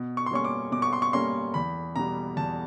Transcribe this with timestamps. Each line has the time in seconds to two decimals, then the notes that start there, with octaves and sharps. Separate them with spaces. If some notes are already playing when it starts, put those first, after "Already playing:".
Already playing: B2
0.17 C#6
0.26 C6
0.31 G3 A#3 C#4 C#6
0.45 D6
0.72 B2 D6
0.82 C#6
0.93 C6
1.02 C#6
1.13 G3 A#3 C#4 C6
1.54 E2 B5
1.96 B2 G3 A#5
2.37 E2 A5